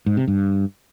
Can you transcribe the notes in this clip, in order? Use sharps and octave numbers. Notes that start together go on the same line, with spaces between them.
G#2
C3
G2